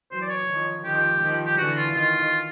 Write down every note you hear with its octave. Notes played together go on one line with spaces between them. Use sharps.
E3 F#3 C5
D5
C#5
D#3 F3
D#3 F3 G4
D#3 F3
G4
D3 E3 F#4
F4
D#3 F4